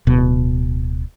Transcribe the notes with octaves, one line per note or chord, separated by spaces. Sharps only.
D1 B2